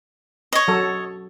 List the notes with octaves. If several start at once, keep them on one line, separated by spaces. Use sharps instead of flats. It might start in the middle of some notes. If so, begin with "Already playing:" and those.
C#5 D#5
F#3 A4